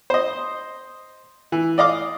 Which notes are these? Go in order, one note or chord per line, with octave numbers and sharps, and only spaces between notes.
C5 D#5
E3
D5 D#5 F5 D6